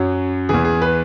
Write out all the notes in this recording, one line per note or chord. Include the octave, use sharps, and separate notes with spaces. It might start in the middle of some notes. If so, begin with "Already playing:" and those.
Already playing: F#2 F#3
E2 E3 G#4
G#4
B4